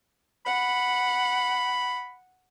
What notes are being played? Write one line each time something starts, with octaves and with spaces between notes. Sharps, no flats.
F#5 B5